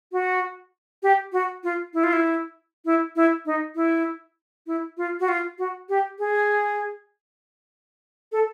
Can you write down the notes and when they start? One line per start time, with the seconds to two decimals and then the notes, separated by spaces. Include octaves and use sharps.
0.12 F#4
1.03 G4
1.33 F#4
1.64 F4
1.94 E4
2.04 F4
2.13 E4
2.85 E4
3.16 E4
3.46 D#4
3.76 E4
4.67 E4
4.97 F4
5.20 F#4
5.28 F4
5.59 F#4
5.89 G4
6.19 G#4
8.32 A4